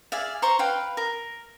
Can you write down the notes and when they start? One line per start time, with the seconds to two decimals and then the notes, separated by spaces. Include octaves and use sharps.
0.12 G#4 D5 E5 F5
0.42 C5 A#5 C6 C#6
0.59 B4 F5 G5
0.97 A#4